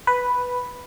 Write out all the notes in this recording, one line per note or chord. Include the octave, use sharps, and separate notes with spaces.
B4